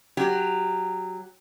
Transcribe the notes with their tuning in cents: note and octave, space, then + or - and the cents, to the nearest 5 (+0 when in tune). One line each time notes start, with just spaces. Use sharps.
F#3 +0 G4 +10